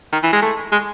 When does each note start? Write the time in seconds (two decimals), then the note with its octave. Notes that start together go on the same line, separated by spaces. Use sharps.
0.13 D#3
0.23 E3
0.33 G#3
0.42 A3
0.72 G#3